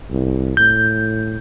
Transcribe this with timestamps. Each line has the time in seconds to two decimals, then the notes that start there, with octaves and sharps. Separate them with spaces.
0.10 C2
0.57 A2 G6